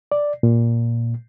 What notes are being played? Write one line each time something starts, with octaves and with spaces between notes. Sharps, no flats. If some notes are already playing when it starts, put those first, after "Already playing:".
D5
A#2